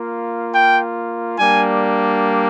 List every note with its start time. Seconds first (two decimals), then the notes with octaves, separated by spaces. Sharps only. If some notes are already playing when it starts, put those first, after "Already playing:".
Already playing: A#3 F4
0.55 G5
1.38 G3 A#3 D4 G#5